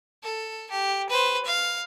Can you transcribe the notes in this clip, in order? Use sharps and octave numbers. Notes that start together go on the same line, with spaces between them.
A4
G4
B4 C5
F5